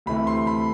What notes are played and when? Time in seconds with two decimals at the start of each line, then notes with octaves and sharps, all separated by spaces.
0.06 D2 C3 E3 A3 B5
0.27 C6
0.47 B5